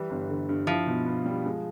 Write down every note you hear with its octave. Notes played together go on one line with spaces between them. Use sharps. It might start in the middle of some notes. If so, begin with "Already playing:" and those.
Already playing: E3 G3
G1
D3
G2
F3 E4
B2
B3
G3
G#3